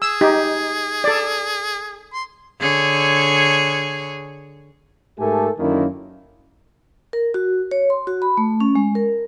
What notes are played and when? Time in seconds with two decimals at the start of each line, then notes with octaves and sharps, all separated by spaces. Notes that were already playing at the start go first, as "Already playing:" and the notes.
0.02 G#4 E6
0.21 D#4 G4
1.04 A4 D5
2.13 C6
2.61 D3 G#4 C#5
5.19 G#2 A3 G4 A4 A#4 G#5
5.58 F#2 D3 D#3 A#3 C#4 E4
7.13 A#4
7.34 F#4
7.71 C#5
7.90 C6
8.07 F#4
8.22 B5
8.37 A3
8.60 C#4
8.75 G#3
8.95 A#4